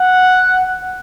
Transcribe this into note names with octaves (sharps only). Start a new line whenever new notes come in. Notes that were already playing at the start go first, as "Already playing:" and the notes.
Already playing: F#5